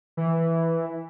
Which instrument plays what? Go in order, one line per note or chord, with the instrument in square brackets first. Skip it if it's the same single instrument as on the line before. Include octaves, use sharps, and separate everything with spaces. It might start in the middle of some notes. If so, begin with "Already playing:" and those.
[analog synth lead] E3